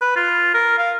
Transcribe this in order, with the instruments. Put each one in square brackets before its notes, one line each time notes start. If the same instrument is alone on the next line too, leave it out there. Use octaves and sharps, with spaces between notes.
[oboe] B4
F4
A#4
F5